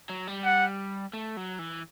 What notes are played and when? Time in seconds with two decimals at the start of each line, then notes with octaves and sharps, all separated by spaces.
0.09 F#3
0.28 G3
0.44 F#5
1.13 A3
1.37 F#3
1.59 E3